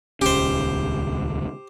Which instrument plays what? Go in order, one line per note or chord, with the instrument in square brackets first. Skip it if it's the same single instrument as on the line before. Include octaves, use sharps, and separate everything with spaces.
[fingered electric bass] D#1 C#2 C#4 [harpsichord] G4 C5